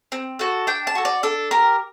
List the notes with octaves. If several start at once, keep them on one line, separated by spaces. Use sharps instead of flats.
C4
F#4 A4
D4 G5
A5
F#4 A4
D5
D4 A4
G4 A#4